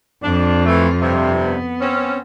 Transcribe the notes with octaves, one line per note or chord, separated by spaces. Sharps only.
F2 D4 F4
E3 A3
G2 C3
B3
C4 C#4